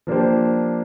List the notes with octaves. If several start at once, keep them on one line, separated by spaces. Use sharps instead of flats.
F3 A#3 D4 G4 C5